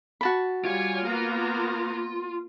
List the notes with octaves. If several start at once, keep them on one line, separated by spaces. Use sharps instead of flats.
F#4 A5 B5
G3 F4 C#5 G#5
A#3 B3 A#5